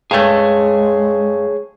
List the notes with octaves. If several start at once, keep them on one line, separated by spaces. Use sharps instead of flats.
G2 G#3 A3 G#4 C#5